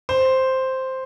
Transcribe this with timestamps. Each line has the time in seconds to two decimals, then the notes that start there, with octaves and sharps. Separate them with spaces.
0.09 C5